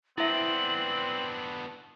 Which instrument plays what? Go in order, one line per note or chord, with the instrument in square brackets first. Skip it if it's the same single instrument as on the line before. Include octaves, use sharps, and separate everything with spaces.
[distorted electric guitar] B3 D4 [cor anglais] C4 [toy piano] E4 E5 [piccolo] F#7